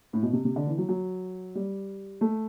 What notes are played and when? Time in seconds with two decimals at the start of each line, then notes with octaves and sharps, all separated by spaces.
0.13 A2
0.22 B2
0.33 C3
0.45 C3
0.56 D3
0.67 E3
0.78 F#3
0.89 F#3
1.55 G3
2.21 A3